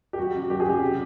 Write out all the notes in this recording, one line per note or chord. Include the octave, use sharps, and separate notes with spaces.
G4
F#3 F#4
C#3
F#3 G4
G#4
C#3 G4
C3